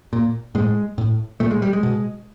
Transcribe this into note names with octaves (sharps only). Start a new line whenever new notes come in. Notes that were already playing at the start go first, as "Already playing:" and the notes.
A#2
A2 G#3
A2
A#2 A3
G#3
G3
G#3
B2